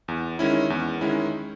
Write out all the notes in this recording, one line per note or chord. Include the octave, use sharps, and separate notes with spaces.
E2
D#3 G#3 C#4 E4
E2
D#3 G#3 C#4 E4